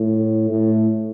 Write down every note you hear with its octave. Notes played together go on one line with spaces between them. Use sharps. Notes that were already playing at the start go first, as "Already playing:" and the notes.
Already playing: A2
A2